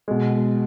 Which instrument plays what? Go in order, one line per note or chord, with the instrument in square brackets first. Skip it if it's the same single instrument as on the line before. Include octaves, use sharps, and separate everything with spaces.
[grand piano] B2 G#3